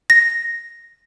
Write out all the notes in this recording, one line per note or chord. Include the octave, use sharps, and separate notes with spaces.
A#6